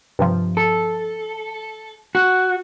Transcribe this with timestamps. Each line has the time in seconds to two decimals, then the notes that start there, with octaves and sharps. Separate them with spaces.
0.19 G2 C3 F3
0.57 A4
2.15 F#4